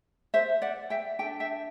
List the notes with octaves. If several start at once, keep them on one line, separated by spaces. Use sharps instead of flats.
C5 E5
D5 F#5
E5 G5
D4 A4 E5 G5
E5 G5